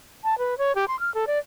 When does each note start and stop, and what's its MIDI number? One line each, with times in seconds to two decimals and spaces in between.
0.24 0.38 81
0.38 0.57 71
0.58 0.75 73
0.75 0.85 67
0.88 0.99 84
1.00 1.12 89
1.14 1.25 69
1.27 1.38 74